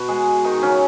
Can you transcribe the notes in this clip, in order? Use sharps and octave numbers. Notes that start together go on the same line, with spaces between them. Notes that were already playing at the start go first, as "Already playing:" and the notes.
Already playing: B2 F#4
G#3 G#4
D#3 D#4
C#3 F#3 C#4